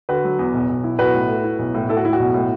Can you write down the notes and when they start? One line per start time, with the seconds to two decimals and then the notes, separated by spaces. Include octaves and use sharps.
0.09 D3 F#4 B4
0.24 F#3
0.39 E2
0.54 B1
0.69 B1
0.84 E4
0.99 B1 F#4 B4
1.14 A2
1.29 A3
1.44 E4
1.59 B1
1.74 A2
1.89 E4 A4
1.97 F#4
2.04 A2 E4
2.13 F#4
2.20 B1
2.34 A2